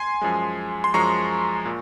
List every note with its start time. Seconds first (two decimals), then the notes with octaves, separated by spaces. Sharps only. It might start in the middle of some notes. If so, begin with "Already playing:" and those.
Already playing: G#5 C6
0.22 F#2 F3 G#3
0.84 C6
0.94 F#2 F3 G#3 A#5 C#6
1.65 A#2